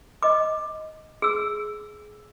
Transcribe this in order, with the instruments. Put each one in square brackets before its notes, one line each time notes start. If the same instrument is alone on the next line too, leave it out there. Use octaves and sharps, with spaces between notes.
[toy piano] D#5 D6
G#4 E6